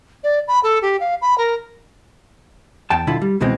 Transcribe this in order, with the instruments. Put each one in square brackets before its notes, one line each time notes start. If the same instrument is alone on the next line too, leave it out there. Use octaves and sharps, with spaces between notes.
[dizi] D5
B5
A4
G4
F5
B5
A#4
[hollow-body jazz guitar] E2 G5 A5
B1 D3 E4 F4 B5
G3
C#2 B2 E3 G#3 C4